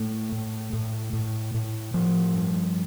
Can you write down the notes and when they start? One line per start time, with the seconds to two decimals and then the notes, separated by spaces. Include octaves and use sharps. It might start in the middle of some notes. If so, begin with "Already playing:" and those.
Already playing: A2 A3
0.32 A2
0.73 A2
1.13 A2
1.54 A2
1.94 A2 F3
2.34 G2